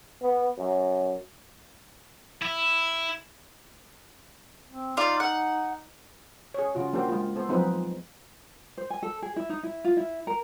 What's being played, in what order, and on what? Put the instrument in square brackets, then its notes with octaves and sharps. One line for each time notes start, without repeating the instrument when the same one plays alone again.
[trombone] B3
F#2
[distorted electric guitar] E4
[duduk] C4
[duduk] D#4 [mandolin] F4 D5 F5
[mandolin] F#5
[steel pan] G#4 C#5
C#3 F4 F#4
G3 A#3 D4 F#4 G4 C5
G#3 F4
B3 A4 C5
F3 F#3 C4 D#4 G#4 B4
[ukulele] C5
G#5
A4
G#4
E4
D#4
E4
F4
E4
A#4